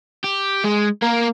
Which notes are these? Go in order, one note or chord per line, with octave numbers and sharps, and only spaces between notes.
G4
G#3
A#3 A#4